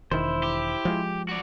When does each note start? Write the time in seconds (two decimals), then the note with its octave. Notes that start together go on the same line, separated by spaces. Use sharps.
0.12 E1 D#3 E4 C5
0.43 G4
0.85 F3 G#3
1.29 F#4 D5